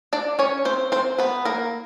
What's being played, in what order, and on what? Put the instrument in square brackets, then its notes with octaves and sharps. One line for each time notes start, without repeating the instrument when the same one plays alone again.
[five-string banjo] D4 D5
C#4 C#5
C4 C5
C4 C5
B3 B4
A#3 A#4